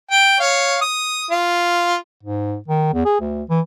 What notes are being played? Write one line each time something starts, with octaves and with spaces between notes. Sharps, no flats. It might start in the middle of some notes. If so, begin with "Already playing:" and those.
G5
C#5 F5
D#6
F4
G#2
D#3
E2
G#4
D2
E3